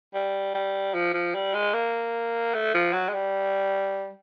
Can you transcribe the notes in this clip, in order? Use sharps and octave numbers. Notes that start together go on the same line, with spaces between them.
G3
G3
F3
F3
G3
G#3
A#3
A3
F3
F#3
G#3
G3